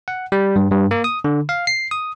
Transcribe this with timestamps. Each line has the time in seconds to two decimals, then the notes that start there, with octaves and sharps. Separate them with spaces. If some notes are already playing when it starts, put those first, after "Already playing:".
0.08 F#5
0.32 G3
0.56 G2
0.72 G2
0.91 A#3
1.04 D#6
1.24 D3
1.49 F5
1.67 C7
1.91 D#6